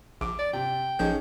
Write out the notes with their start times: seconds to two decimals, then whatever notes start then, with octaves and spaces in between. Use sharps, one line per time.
0.21 A#1 D6
0.39 D5
0.53 C3 G5
0.99 A1 F3 C#4 D#4 G#4 G6